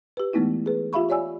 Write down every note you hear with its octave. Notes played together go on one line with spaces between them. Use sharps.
G4 B4
E3 G#3 A3 B3 D#4 E4
G#4 B4
F4 G4 E5 F5 B5 C#6
G4 C#5 D5 G#5 E6